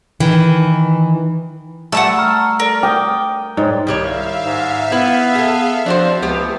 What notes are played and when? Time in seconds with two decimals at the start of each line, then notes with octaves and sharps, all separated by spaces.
0.20 D#3 E3
1.92 G3 A3 F#5 A5 E6
2.18 A#5 C#6 F6
2.60 A4 A#4 D5
2.83 G5 D6 D#6
3.57 G#2 C#5 D5
3.87 C2 D#3 G3 C#5 E5 F5
4.43 G#2
4.92 B3 E4 B4
5.35 G#4 A4
5.86 F3 C4 D4 F#4 C5
6.22 C#2 E3 A3 B3 G4